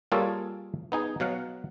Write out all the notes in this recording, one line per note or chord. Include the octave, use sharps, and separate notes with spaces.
G3 A#3 F4 G#4 A4 C#5
B3 D#4 G#4
B2 F#3 F5 F#5